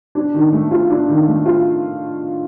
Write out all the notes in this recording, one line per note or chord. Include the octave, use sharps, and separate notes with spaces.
D4
D#3
A3
F4
D4
D#3
A3
F4